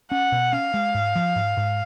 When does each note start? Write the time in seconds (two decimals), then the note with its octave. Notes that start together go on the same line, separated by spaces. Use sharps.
0.11 C#4 F#5
0.32 B2
0.53 C#4 F5
0.74 G#3
0.94 G#2
1.16 F3
1.36 G#2
1.57 G#2